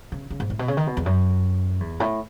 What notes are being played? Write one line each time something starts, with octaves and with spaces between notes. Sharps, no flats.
C#3
C#3
G#2
A2
B2
C#3
D#3
B2
E2
F#2
E2
A2